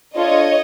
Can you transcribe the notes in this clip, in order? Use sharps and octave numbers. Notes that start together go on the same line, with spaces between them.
D4 F4 A4 C#5 D#5